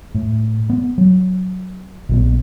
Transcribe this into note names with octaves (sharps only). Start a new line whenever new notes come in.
A2
B3
F#3
A#1 E3 B3